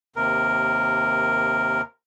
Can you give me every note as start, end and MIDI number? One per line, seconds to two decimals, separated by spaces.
0.16 1.81 39
0.16 1.81 48
0.16 1.81 70